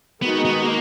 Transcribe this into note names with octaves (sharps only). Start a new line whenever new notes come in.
D#3 G#3 B3 D#4 F#4
B3
A#3